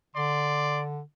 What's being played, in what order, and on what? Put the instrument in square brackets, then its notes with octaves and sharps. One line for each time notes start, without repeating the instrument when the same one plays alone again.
[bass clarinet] D3 [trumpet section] D5 C6